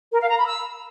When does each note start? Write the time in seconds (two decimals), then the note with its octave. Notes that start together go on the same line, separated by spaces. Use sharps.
0.12 A#4
0.20 F5
0.29 A#5
0.37 B5
0.46 E6